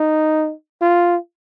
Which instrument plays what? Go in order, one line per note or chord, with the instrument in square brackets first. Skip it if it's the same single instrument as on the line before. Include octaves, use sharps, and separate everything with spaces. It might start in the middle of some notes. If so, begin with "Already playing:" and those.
Already playing: [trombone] D#4
F4